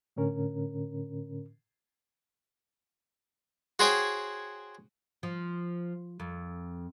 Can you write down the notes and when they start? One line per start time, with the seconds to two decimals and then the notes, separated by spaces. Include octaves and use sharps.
0.16 A2 D3 C#4 A#4
3.79 F#4 G#4 C5 C#5 G5 D#6
5.23 F3
6.20 F2